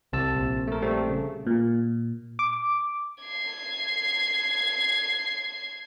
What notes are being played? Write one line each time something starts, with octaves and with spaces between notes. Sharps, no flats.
C2 C3 A5 E6
A#1
A3 A#4
G3 A3 C4
C#3
A#2
D6
G#6 C7